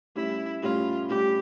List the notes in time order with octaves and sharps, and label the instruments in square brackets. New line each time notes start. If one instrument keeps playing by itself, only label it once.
[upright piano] A2 G3 C#4 [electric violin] E4
[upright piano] A2 G3 C#4 [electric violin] F4
[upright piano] A2 G3 C#4 [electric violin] G4